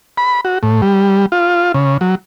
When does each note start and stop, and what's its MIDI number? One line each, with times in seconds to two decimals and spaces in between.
0.18 0.41 83
0.45 0.58 66
0.63 0.81 45
0.82 1.26 55
1.32 1.72 65
1.74 1.97 49
2.01 2.15 54